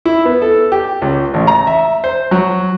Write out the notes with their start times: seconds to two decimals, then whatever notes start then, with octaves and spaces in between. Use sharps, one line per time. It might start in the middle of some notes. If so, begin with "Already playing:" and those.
0.06 E4
0.25 B3
0.42 A4
0.72 G4
1.02 C#2
1.34 A1
1.47 A#5
1.67 E5
2.04 C5
2.31 F#3